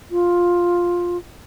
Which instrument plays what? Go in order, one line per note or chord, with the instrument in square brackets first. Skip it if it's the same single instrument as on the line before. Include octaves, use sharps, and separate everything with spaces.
[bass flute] F4